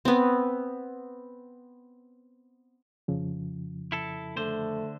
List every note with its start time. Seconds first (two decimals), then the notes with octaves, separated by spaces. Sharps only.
0.05 B3 C4
3.08 F2 C#3 F3
3.92 E4 A4
4.37 D3 A3 C5